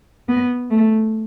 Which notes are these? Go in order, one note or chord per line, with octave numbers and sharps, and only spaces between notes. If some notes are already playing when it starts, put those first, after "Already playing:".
B3
A3